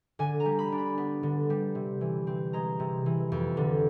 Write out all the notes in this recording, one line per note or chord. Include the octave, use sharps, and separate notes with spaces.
D3 G#5
A#5
G3
B5
D4
B5
B3 B5
D3
G3
C3
E3
C4
G#3 A#5
C3
E3
F2
D3